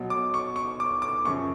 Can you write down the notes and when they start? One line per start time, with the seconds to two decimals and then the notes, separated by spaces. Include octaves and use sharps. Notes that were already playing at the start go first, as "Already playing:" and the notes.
Already playing: B2 F#3
0.10 D6
0.34 C#6
0.56 C#6
0.80 D6
1.02 D6
1.25 F#2 C#3 F3 C#6